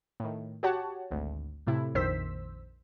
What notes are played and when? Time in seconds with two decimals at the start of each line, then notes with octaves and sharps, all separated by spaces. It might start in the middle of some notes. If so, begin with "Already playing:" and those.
0.20 A2 D#3
0.63 F#4 G4 C#5 F#5 A5
1.11 G#1 D2
1.67 A2 C3 E4
1.95 A#1 F2 D#3 C5 E6 B6